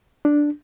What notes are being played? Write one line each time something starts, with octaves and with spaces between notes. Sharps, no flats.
D4